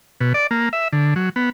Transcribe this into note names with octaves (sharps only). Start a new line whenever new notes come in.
B2
D5
A#3
E5
D3
F#3
B3